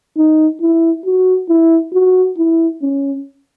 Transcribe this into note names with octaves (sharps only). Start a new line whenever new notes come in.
D#4
E4
F#4
E4
F#4
E4
C#4